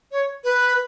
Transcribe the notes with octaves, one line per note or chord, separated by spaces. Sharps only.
C#5
B4